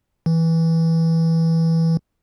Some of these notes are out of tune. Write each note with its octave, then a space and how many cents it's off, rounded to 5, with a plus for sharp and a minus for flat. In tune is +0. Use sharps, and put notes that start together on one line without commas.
E3 -10